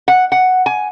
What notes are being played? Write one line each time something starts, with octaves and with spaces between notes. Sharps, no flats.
F#5
F#5
G#5